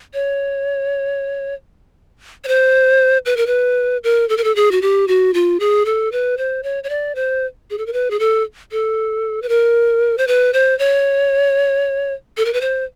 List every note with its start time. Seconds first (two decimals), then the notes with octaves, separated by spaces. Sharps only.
0.14 C#5
2.44 C#5
2.48 C5
3.26 B4
3.37 A#4
3.47 B4
4.04 A#4
4.29 A4
4.37 A#4
4.44 A4
4.56 G#4
4.72 F#4
4.82 G4
5.08 F#4
5.34 F4
5.60 G#4
5.86 A4
6.12 B4
6.38 C5
6.63 C#5
6.84 C#5
6.89 D5
7.15 C5
7.70 G#4
7.78 A4
7.86 A#4
7.93 B4
8.11 G#4
8.20 A4
8.72 A4
9.42 B4
9.49 A#4
10.18 C5
10.27 B4
10.53 C5
10.79 C#5
12.37 A4
12.45 A#4
12.53 B4
12.61 C5